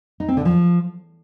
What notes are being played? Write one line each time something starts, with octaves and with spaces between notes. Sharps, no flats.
D#4
C4
D3
F3